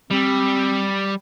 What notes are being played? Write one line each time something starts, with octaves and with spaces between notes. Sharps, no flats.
G3 C4